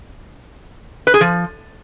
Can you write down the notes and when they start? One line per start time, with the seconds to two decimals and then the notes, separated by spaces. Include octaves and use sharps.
1.07 B4
1.14 G#4
1.21 F3